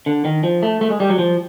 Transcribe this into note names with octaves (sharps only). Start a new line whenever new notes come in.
D3
D#3
F3
A3
A3
G#3
G3
F#3
F3